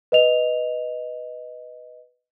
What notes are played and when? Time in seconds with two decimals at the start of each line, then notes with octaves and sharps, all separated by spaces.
0.12 B4 D#5 F7